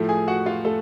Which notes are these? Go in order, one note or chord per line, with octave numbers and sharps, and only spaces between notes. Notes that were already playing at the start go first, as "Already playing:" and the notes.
Already playing: A2 F3 A3
G#4 G#5
F#4 F#5
F4 F5
A3 A4